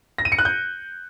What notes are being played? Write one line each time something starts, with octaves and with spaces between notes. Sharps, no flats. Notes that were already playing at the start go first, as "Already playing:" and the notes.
A#6
D#7
C#7
F#6
G6